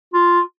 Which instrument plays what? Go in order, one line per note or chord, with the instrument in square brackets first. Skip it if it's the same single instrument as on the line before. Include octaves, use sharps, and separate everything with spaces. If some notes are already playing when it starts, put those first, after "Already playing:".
[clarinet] F4